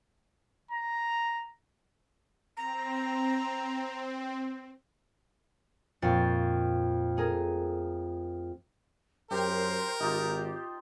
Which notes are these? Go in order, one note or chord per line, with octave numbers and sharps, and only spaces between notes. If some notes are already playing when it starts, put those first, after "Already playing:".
A#5
C4 A#5
F2 A#2 G5 C#6 A6 C7
A3 G#4 A#4
F#2 G4 A#4 C5
G#1 D#4 F4 G4 C5